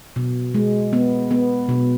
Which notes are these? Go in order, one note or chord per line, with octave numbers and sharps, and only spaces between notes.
B2
G#3
B3
B3
B2